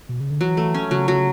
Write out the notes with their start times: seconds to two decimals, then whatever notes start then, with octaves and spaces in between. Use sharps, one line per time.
0.09 B2
0.20 C#3
0.30 D3
0.40 E3 F#3
0.57 A3
0.74 C#4
0.91 C#3 F#3
1.08 F#3